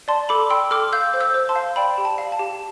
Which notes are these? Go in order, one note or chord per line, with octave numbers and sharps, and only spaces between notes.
D5 A5 C6
A4 B5 D6
G5 C6 E6
A4 D6 F6
F5 E6 G6
C5
E6 G6
C5
A5 C6
F5
D5 G5 B5
G4
A5
F5
A5
G4